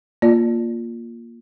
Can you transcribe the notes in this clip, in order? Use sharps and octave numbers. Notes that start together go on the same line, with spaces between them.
A#3 F4 D5